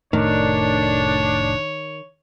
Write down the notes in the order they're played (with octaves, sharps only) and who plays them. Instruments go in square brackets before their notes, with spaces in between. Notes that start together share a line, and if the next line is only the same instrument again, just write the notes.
[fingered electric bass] F1 A2 A3 [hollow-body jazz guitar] D#3 [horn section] D4 [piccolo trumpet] C#5